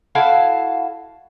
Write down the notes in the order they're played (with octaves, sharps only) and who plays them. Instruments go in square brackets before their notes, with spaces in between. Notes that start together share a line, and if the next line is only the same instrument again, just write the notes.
[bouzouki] E4 F#4 A4 F5